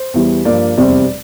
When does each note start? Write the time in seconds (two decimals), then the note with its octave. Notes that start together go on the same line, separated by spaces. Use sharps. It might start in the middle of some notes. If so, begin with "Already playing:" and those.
Already playing: C5
0.14 E2 E3 G3
0.45 G2 F3 A#3 D5
0.77 F1 E2 C3 G3 C4 D5